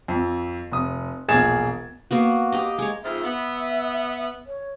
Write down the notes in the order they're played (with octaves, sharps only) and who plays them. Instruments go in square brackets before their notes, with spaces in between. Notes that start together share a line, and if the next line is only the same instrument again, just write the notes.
[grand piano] F2
F1 D#6
E1 A#1 G#4 G#6 A6 E7
[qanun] A#3 B3 F#4
G4 D#5 A#5
G#3 C#5
[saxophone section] F2 G#2 F4 [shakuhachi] E5
[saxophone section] B3
[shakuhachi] C#5